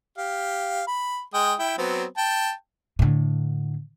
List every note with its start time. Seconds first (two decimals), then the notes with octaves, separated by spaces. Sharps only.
0.18 G4 F5
0.87 B5
1.34 G#3 G5 D#6
1.59 E4 G5
1.78 F#3 B3 C4
2.17 G5 A5
2.99 A2 D3